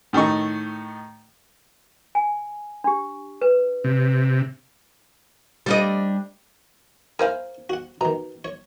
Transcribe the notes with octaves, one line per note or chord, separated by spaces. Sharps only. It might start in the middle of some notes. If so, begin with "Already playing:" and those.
A2 D#3 A3 D#4 C#6
G#5
D4 G4
B4
C3
G3 D4 D#5
E4 A#4 C5 F5 G#5
F#4 F#5
B2 D#3 A#5
C#5